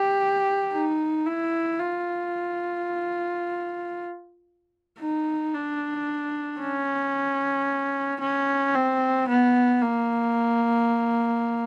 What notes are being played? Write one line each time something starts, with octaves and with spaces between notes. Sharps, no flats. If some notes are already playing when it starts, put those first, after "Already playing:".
Already playing: G4
D#4
E4
F4
D#4
D4
C#4
C#4
C4
B3
A#3